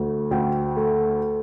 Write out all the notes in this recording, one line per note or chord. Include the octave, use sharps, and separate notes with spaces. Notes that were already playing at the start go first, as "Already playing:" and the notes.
Already playing: D2 A3
D2 G5
A3